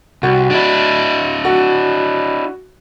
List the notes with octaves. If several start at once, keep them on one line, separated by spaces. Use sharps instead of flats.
C2 F#4
D4 E4
F#4